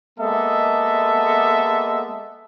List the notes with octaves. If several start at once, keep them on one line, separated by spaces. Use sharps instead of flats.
G#3 A#3 B3 A4 D#5 E5